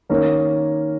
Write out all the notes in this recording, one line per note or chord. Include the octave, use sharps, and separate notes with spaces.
D#3 A#3 C#4 A#4